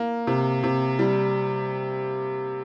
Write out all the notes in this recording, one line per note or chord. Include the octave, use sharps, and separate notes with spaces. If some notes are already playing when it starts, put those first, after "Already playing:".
Already playing: A#3
C3
C3
G3